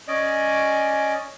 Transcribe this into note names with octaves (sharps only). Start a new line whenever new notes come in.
C#4 D5 D#5 G#5 D6